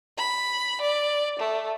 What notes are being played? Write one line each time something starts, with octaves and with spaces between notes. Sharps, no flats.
B5
D5
A3